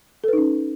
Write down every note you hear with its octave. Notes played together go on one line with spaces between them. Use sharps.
C#4 D#4 A4 B4